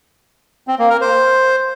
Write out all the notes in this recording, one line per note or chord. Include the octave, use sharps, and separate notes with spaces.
C4
A#3
A#4
C5